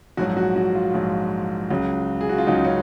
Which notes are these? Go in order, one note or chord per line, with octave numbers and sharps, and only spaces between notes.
A#1 G#2 F#3 F#4
F#4
F#4
F4
A#1 G#2 F#3
C#2 C#3 F#3
G#4
F#4
F4
C#2 C#3 F#3 D#4
C#4